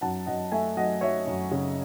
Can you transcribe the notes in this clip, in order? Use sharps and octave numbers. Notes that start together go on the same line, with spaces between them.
F#2 F#5 A5
F#2 D#5 F#5
A3 E5 G#5
F#3 D#5 F#5
F#3 C#5 E5
F#2
C#3